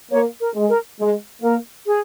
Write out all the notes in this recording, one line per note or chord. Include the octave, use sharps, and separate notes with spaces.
A#3 C#5
A#4
G#3
A#4
G#3
A#3 A#4
G#4